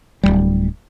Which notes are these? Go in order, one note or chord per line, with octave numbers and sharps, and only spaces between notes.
D1 D#2 G3